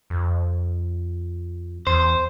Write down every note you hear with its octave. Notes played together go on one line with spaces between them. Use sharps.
F2
E2 C5